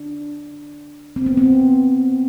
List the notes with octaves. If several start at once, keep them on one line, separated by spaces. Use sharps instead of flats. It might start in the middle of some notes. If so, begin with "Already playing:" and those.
Already playing: D4
C4
B3
C4